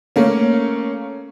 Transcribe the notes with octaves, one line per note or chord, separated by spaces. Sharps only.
A3 A#3 C#4